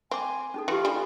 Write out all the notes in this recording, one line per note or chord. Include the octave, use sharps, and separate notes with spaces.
C4 G#5 B5 D6
C#4 D#4 G#4 A4
E3 F4 G4 C6
G3 D4 A4